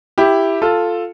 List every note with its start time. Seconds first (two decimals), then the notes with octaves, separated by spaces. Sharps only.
0.18 E4 G4
0.62 F4 A4